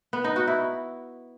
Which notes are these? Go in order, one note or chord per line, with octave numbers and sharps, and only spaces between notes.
B3
D#4
F#4
E4